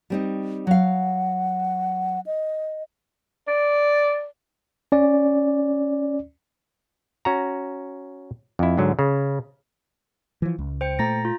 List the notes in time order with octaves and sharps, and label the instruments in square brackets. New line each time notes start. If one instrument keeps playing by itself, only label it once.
[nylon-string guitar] G3 C4 D#4
[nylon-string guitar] F#3 F5 [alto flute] F#5
[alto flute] D#5
[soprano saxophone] D5
[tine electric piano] C#4 D5
[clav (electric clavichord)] C#4 F#4 A#5
F2 E4
G#2 D3 F#3
C#3
[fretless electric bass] E3 F3
C#2
[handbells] C5 G5 C#7
[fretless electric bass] A#2 A3 [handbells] A#5 A6 A#6
[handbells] F4